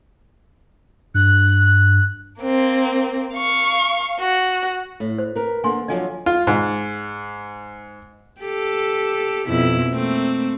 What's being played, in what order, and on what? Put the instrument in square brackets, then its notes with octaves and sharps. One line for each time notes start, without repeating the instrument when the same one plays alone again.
[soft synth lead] G2 [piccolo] F#6
[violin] A#3 C4
F5 C#6
F#4
[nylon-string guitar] A2
[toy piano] C5
[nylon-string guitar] A#4 B4
[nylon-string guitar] D3 A#3 [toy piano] G#5 C6
[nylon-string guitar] D3 F3 F#3 [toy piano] D#5 G#5
[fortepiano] F4
G#2
[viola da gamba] G4 A4
F2 B2 E4
A3 A#3 C4